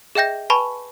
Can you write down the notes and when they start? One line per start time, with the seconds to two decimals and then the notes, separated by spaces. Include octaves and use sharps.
0.15 G#4 D#5 E5 G5 G6 A#6
0.50 B4 G#5 A5 B5 C#6